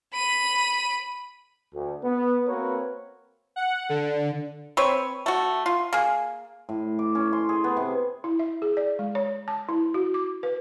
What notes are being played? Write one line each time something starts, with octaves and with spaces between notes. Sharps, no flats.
B5 D#7
D2
B3
A#3 C4 F#4 A#4 B4 C#5
F#5
D3
C4 B4 C#5
A3 F#4
F4
A#3 G#4
A2
D6
C#4
C6
G#4
B3
C3
E4
E5
G#4
D5
G#3
C#5
A5
E4
F#4
D6
B4